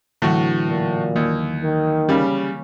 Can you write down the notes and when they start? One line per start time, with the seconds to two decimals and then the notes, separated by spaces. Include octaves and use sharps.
0.22 A2 D3 E3 F#3 F#4
0.67 A#2
1.16 D#2 A#3
1.63 D#3
2.09 C#3 G3 C#4